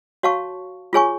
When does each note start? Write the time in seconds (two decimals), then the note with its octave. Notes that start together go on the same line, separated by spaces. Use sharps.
0.23 F#4 C#5 F5 A5 C#6
0.93 F4 G#4 C#5 G#5 C#6